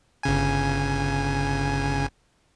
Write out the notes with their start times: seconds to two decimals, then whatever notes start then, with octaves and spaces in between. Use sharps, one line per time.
0.23 G1 C#3 G#5